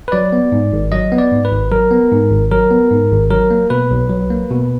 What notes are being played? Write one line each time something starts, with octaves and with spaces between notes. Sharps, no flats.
B4
F#3 D5
B3
G#2
G#1
F#3 D#5
B3
D5
G#2
B4
G#1
F#3 A#4
B3
G#2
G#1
F#3 A#4
B3
G#2
G#1
F#3 A#4
A#3
B2 B4
B1
F#3
A#3
B2